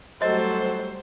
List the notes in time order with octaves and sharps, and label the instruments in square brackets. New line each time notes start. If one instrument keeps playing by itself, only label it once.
[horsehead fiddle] F#3 A4 [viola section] G3 A3 [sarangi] C5 [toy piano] D#5